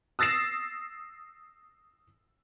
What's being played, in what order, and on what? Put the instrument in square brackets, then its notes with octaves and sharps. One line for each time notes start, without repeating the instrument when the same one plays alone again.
[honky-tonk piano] D#6 E6 A6 A#6 C7 E7